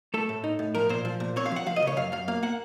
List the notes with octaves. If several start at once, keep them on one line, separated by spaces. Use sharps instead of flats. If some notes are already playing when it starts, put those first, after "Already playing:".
A3 A4
A2
D#4
A2
F3 A#4
A#2 C5
F3
A#2
C4 C#5
F5
F3 F#5
F3 F5
D#5
C#3 C#5
F#2 F5
F#2 F5
A#3 F5
A#3 F#5